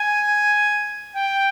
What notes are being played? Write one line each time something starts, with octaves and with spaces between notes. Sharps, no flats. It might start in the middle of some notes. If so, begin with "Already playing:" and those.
Already playing: G#5
G5